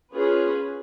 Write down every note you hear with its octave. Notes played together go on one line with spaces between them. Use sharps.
C#4 F4 G#4 B4